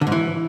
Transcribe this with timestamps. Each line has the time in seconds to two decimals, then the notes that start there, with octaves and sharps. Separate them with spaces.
0.01 D3
0.07 G#2
0.12 E3